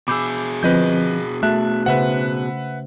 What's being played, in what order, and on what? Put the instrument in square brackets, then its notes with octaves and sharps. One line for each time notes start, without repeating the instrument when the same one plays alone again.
[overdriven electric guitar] B2 G#4 [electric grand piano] B5 E6 [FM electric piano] D6 G6
[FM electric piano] D3 F3 C4 [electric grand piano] B4 D#5 G6
[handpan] A3 F#4 [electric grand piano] E5 A5 [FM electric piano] F#6
[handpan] C#3 C5 [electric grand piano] B4 E5 F#5